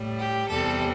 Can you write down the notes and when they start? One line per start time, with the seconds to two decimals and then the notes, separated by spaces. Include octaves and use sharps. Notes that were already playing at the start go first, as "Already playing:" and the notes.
Already playing: A2 G3
0.18 G4
0.48 E2 C3 E3 G3 A4